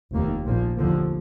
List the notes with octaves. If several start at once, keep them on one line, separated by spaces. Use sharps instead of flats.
F1 D#2 D#3 A#3
A#1 A#2 F3 A#3
F1 D#2 D3 F3 A#3